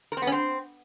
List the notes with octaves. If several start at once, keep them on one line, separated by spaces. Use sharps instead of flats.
A#4
C4
B3
C#4
C4